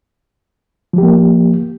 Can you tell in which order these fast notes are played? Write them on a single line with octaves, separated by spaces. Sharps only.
F3 G4 A#3